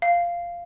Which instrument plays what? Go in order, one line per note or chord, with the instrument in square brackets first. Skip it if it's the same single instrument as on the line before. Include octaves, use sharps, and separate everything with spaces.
[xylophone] F5